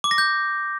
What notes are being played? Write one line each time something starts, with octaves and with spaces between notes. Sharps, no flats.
D6
A#6
G6